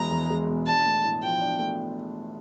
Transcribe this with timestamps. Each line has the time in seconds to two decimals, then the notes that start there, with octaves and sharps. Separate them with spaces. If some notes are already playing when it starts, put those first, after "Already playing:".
Already playing: E1 B2 G#3 A#5
0.11 E2
0.30 G#3
0.48 B2
0.67 D4 A5
0.86 A3
1.04 A2
1.22 F3 G5
1.41 D4
1.59 A3